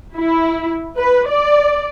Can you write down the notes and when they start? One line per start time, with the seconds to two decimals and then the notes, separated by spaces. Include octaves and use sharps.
0.16 E4
0.98 B4
1.29 D5